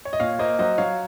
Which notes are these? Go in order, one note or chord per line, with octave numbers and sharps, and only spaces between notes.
C#5
D#5
A#2 C#5 F5
A#3 C5 D#5
F#3 C5 D#5
F#3 C#5 F5